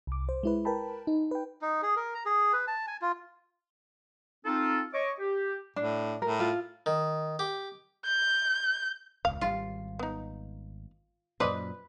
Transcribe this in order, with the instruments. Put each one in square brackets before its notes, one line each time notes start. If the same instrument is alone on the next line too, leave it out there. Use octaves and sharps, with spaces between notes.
[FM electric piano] C2 D6
C5
G#3 E4 B4
A#4 B4 G5 A5 B5
D#4
B4 G5
[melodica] D#4
G#4
A#4
A#5
G#4
B4
A5
G#5
F4
[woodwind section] C4 D#4 F4 A4
C#5 D#5 C#6 D6
G4
[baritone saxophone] A2 [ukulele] D4
[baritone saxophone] A2 [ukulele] A#4
[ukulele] F4
[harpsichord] D#3
G4
[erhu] G6
[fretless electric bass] E1 C#2 [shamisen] F5
[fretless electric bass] G#1 G3 [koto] F4
[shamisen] B3 D#4
[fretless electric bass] F#2 A#2 [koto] B4 [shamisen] C5 D5 D#5